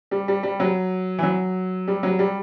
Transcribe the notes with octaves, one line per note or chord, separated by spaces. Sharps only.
G3
G3
G3
F#3
E3
F#3
G3
F#3
G3